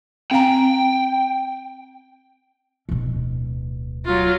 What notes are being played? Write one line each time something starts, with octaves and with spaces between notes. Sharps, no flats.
C4 F5 G5 A#5
D1 B2
F#3 F4